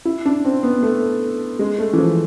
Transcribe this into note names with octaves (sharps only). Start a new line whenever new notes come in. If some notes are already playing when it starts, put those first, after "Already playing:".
E4
D4
C4
B3
A3
G#3
A3
E3
F3